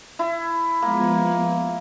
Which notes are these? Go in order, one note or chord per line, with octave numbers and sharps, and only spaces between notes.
E4
F3 G#3 A#3 B3